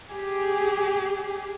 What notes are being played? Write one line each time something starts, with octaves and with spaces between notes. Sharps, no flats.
G4 G#4